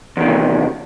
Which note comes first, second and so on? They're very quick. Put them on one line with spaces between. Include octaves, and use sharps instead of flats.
E2 D#3 C3